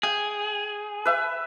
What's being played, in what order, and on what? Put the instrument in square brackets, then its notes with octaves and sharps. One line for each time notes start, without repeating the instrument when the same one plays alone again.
[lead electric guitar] G#4 [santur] G5
[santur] B4 E5